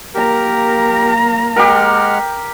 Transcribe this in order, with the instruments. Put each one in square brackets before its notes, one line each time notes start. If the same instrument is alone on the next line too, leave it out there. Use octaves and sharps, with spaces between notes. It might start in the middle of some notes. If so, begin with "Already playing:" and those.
[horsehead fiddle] A#3 A#5 [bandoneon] G4 A#4
[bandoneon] G#3 F#5 F6 [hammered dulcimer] G4 A#4